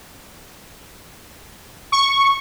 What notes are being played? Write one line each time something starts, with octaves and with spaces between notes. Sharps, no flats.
C#6